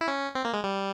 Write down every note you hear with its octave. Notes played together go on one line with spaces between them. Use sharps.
E4
C#4
C4
A#3
G#3
G3